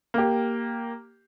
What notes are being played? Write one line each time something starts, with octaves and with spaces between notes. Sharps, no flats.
A#3 G4